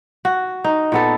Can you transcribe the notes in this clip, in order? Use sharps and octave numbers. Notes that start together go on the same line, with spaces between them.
F#4
D#4
A#2 B3 A4